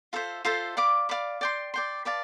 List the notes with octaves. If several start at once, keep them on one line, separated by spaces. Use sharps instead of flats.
F4 A4 C5 E5
F4 A4 C5 E5
D5 F5 B5 D6
D5 F5 B5 D6
D5 G5 C6
D5 G5 C6
B4 D5 F5 A5